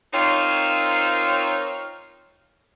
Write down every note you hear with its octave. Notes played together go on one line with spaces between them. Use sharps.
C4 D#4 F4 A#4 C5 C#5